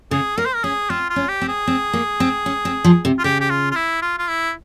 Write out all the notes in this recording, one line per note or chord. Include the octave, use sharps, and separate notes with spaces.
C#3 G#4
A#3 A#4
C5
A#4
C#4 G#4
C4 F4
F4
C#4
G4
C4
G#4
C4
A#3
C4
C#4
C4
F3
C3
F4
C#3 G4
G4
F4
F4
E4
F4
F4
E4